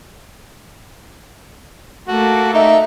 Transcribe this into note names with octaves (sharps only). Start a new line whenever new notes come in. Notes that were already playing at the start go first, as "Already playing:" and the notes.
A3 A#3 F#4 A4
D#4 E5